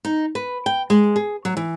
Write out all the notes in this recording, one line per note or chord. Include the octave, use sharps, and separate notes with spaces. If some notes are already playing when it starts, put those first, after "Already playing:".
D#4
B4
G5
G#3
G#4
F#3
E3